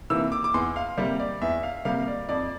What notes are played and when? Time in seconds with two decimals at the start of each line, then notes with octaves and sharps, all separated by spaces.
0.10 C3 E3 A#3 E6
0.32 D6
0.44 D6
0.54 E2 C6
0.76 F5
0.97 C3 G3 A#3
1.20 D5
1.41 E2 E5
1.63 F5
1.85 C3 G3 A#3 F5
2.08 D5
2.29 F2 D5